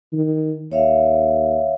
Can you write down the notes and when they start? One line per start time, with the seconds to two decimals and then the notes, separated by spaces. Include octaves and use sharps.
0.13 D#3
0.72 D#2 C#5 E5 F5